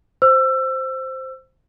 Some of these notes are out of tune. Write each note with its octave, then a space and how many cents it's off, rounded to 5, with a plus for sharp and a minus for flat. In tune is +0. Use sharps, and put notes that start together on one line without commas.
C5 +0 E6 +25